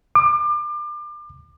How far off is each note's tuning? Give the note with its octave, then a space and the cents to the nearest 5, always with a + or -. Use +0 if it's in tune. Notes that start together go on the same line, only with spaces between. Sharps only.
D6 +30